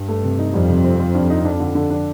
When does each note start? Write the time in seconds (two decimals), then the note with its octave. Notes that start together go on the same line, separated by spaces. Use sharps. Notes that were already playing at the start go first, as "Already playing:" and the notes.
Already playing: G2
0.08 A3
0.23 C3
0.39 D#4
0.53 F2 G3
0.69 C3
0.84 C4
1.00 C4
1.15 G2
1.30 D#4
1.45 D4
1.60 D3
1.75 D3
1.90 D4